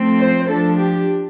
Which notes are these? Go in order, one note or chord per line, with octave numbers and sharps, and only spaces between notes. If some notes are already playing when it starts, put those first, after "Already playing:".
Already playing: F3 A3 C4
C5
F3 D4 A4
G4